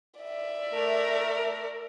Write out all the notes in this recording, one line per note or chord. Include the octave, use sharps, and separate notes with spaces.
D5 E5
A3 A#4